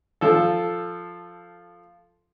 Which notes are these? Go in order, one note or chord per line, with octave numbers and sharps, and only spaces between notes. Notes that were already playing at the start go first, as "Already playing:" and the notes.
F3 A4